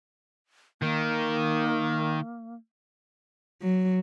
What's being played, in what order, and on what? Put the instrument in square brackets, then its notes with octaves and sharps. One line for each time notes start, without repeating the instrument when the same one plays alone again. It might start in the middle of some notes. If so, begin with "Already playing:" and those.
[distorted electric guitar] D#3 [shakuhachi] A#3
[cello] F#3